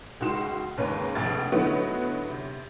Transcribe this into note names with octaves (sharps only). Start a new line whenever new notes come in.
C#2 G#3 D#4 F#4 C6 E7
D#2 G#2 C#3 B4 C#5 A#5
F1 A#1 F2 F#5 G#6 A6
D3 F#3 A3 B3 D#4 E4
C3